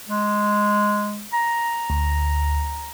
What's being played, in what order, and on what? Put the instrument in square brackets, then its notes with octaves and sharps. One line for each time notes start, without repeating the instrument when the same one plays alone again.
[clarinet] G#3
A#5
[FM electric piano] D2